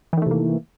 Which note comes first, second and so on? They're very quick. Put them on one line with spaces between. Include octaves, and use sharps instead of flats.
E3 D#3 A3 C3 A#3